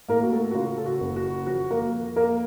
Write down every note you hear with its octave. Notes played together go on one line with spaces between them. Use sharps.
A2 A#3 A#4
F#4
A3 A4
F#4
C#3 F4
A4
F#4
F#1
F#4
F2 F#4
A#3 A#4
F2
A#3 A#4